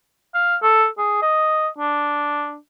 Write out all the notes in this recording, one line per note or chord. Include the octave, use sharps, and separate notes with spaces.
F5
A4
G#4
D#5
D4